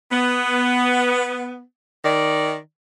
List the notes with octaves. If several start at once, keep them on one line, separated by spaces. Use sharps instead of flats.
B3
D#3 D5